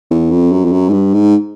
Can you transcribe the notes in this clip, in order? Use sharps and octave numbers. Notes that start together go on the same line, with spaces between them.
E2
F2
F#2
F2
F#2
G#2
G2
G#2